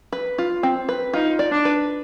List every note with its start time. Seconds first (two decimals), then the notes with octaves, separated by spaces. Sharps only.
0.12 B4
0.38 F4
0.63 C4
0.89 B4
1.13 D#4 F4
1.39 D5
1.51 D4
1.65 B4